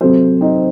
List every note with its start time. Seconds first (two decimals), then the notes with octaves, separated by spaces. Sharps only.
0.01 C3 F#3 A4 C5
0.41 C4 D#4